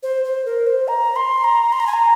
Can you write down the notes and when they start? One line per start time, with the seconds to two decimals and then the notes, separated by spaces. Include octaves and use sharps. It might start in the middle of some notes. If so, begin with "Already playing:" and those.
0.03 C5
0.24 C5
0.46 A#4
0.67 C5
0.88 A#5
1.16 C6
1.44 A#5
1.73 C6
1.80 A#5
1.87 G#5
1.93 A#5